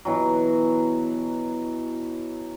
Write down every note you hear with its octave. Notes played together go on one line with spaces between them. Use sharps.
B2 E3 F#3